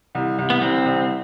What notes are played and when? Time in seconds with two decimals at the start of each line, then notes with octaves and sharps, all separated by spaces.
0.15 C2
0.38 C2
0.50 B3
0.61 C2 C4
0.85 C2